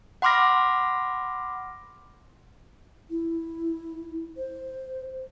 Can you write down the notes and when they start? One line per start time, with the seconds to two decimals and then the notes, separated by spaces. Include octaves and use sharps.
0.22 F#5 B5 C6 D6 F6 A#6
3.10 E4
4.37 C5